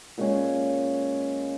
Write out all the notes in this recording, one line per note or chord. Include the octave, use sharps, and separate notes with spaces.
A#2 G#3 C#4